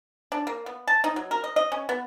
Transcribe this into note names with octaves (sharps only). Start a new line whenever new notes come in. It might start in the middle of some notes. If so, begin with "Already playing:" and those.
D4
A#3
B3
A5
D#4
F#3
A#4
D#5
D#5
C#4
B3